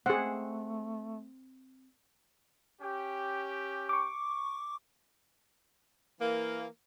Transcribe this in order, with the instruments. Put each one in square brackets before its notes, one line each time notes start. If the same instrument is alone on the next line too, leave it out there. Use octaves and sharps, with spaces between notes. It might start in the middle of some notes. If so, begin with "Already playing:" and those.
[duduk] A3 [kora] C4 [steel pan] G#4 F#5
[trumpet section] C#4 G4
[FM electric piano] C#6 D6
[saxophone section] E3 A#3